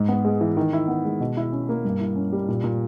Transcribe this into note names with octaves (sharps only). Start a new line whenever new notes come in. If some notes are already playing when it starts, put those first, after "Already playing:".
Already playing: G#2
B3
G#3
E3
D#3
E4
B3
G#3
B2
E4
C#4
A#3
G2
E4
C#4
G3
A#2
A#2